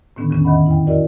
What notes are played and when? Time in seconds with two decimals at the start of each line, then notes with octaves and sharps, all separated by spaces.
0.16 A2 D3 D#3 B3 C#4 D4
0.30 E2 D#3 C#4
0.44 F2 D#3 D#5 E5 F#5 B5
0.66 E4 G5
0.86 E4 F#4 A#4 D5 D#5